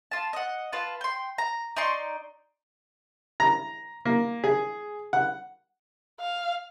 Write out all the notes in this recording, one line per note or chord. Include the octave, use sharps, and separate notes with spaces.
F4 A5
D#5 F#5
F4 B4 A5
G5 C6
A#5
D#4 D5 C6 C#6
A#5
A#3
G#4
F#5
F5